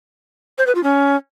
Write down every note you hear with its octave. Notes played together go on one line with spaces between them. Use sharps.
C5
B4
F4
C#4